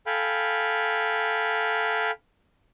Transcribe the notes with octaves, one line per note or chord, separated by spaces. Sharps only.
A4 F5 G5 G#5 B5